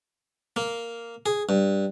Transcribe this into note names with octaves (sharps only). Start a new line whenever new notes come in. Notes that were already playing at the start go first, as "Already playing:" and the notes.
A#3
G#4
G2